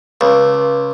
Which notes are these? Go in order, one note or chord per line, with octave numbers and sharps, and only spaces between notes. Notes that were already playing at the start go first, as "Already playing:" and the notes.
C#2